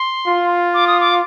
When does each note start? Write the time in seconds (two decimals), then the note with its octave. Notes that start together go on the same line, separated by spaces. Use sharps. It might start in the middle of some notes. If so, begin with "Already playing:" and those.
Already playing: C6
0.27 F4
0.74 D6
0.87 D#6
1.00 D6